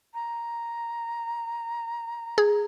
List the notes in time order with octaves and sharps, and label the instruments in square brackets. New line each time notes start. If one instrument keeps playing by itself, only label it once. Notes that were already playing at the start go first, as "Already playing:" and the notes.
[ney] A#5
[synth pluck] G#4